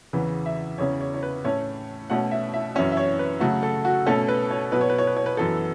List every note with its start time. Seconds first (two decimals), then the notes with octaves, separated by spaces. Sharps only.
0.13 E2 C#3 E3 B3
0.46 E5
0.78 E2 C#3 E3 C#4 C#5
1.00 C#5
1.14 C#5
1.23 B4
1.44 A2 A3 C#4 C#5
2.10 B2 A3 C#4 F#5
2.31 E5
2.54 E5
2.75 F#2 E3 C#4 E5
2.92 E5
2.97 C#5
3.19 B4
3.40 C#3 F#3 A3 F#4
3.63 A4
3.85 F#4
4.06 B2 A3 C#4 A4
4.29 B4
4.51 C#5
4.72 B2 F#3 B3 B4
4.81 C#5
4.89 B4
4.98 C#5
5.07 B4
5.17 C#5
5.26 B4
5.37 F#2 E3 B3 A4